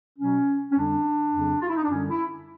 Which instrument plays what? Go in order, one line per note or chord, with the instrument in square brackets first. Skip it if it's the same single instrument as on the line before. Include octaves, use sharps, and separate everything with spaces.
[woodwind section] B2 F#3 C#4
C#4
F2 D3 G3 D4
F2 C#3 F#3
F4
E4
D#4
D4
F#2 D3 G3 C#4
E4